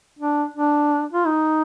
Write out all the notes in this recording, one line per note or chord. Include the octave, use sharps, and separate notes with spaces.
D4
D4
F4
D#4